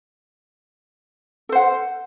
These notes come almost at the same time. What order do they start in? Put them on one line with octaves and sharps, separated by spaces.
A4 C5 F#5